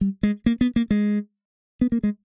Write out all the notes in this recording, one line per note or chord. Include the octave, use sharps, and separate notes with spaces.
G3
G#3
A#3
B3
A#3
G#3
B3
A#3
G#3